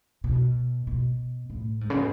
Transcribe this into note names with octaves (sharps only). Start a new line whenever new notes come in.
B2
B2
A2
G#2
C#3
B2